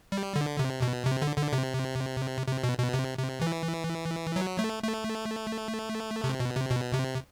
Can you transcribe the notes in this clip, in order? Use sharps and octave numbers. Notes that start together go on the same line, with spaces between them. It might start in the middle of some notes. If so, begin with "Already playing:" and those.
G3
D3
C3
B2
C3
D3
D3
C3
C3
B2
B2
C3
C3
E3
F#3
A3
A3
C3
B2
C3
B2
C3